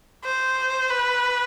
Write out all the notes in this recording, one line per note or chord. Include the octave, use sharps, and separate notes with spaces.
C5
B4